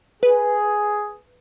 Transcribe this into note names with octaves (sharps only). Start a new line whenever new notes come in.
G#4 B4